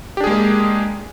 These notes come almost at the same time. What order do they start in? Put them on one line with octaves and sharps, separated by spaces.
G4 D4 G#4 G#3 A#3